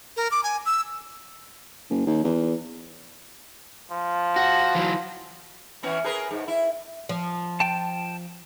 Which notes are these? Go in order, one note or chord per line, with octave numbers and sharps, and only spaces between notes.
A#4
D6
G#5
E6
F#1
D#2
E2
F3
F#4
E3 F#3
E3 B3 C#4
G#4 A#4 B4
G#2
E4
F3
G5 A5